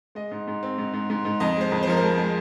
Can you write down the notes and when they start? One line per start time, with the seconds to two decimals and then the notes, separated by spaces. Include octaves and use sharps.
0.15 G#3 D#5
0.31 G#2
0.48 G#2
0.63 C4
0.78 G#2
0.94 G#2
1.10 G#2
1.25 G#2
1.40 F2 D#5
1.56 G#3 C5
1.72 F2
1.83 C5
1.87 F3 A#4
1.97 C5
2.03 G#3
2.18 G#3